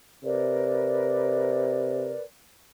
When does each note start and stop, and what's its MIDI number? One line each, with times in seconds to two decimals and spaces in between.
0.24 2.14 48
0.24 2.22 70
0.24 2.22 71
0.24 2.22 74